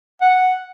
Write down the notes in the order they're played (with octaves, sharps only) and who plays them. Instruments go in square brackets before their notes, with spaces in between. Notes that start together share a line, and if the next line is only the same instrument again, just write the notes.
[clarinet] F#5